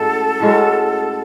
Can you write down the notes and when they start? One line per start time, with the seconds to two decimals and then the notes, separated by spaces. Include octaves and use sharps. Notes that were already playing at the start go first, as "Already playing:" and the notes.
Already playing: A2 G#3 C#4 F#4 A4
0.40 A2 G#3 C#4 F#4